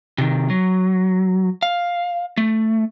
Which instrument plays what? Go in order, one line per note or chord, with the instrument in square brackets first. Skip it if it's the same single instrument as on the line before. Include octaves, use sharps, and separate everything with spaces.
[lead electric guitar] C3 D#3
F#3
F5
A3